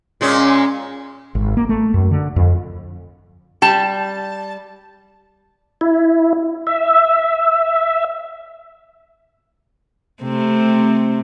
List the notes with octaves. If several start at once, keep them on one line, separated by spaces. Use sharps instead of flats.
A#2 G#3 C#4
G#1
A#3
A3
F#2
D3
F2
G3 A5
E4
E5
C3 A3 C4